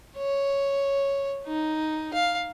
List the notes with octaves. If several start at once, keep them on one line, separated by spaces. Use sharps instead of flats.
C#5
D#4
F5